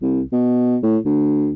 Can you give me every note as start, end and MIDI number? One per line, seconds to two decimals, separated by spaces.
0.02 0.21 36
0.32 0.77 47
0.83 0.98 45
1.05 1.52 38